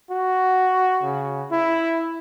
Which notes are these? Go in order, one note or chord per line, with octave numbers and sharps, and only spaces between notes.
F#4
C#3
E4